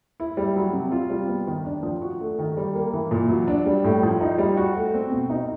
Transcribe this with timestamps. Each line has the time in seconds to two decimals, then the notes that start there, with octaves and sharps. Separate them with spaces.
0.20 E4
0.37 G3
0.56 F#3
0.73 C3
0.92 F4
1.10 G3
1.28 B3
1.47 D#3
1.65 D4
1.83 F3
2.02 F#4
2.20 A3
2.39 D#3
2.57 G3
2.75 A#3
2.93 E3
3.11 A#2
3.29 F#3
3.48 D4
3.66 G3
3.84 A2
4.03 F3
4.21 D#4
4.38 G3
4.57 F#4
4.76 A3
4.94 C4
5.12 B2
5.30 D#4